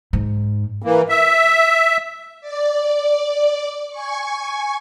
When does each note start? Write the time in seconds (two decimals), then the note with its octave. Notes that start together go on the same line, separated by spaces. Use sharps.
0.13 G#2
0.82 E3 A#3
1.09 E5
2.41 D5
3.90 G#5 C#6